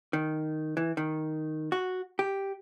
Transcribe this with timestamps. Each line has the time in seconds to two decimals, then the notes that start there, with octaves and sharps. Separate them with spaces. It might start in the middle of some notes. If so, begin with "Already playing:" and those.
0.13 D#3
0.77 E3
0.97 D#3
1.72 F#4
2.19 G4